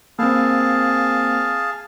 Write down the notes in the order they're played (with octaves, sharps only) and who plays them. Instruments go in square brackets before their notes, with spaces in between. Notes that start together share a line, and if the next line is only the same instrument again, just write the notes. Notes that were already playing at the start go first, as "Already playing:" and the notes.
[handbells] A#3 C4 [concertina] G#4 F5 A5